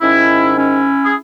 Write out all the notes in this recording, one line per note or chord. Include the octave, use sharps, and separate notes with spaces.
G#2 D#3 C#4 E4
C#4 E4
G#4